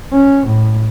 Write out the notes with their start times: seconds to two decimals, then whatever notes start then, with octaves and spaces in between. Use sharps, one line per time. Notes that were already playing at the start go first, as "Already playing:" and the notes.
0.12 C#4
0.46 A2